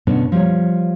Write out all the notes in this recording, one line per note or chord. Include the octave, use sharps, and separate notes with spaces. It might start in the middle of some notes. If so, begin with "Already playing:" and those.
B2 D3 A3 B3 C#4 D4
F3 G3 C#5